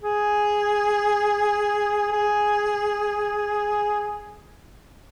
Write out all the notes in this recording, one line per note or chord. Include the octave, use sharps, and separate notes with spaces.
G#4
G#4